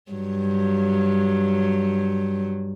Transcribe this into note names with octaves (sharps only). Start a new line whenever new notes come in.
G2 F#3